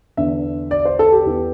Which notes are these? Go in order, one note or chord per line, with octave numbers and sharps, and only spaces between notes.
E2 D3 E5
D5
C5
A4
G4
E2 E3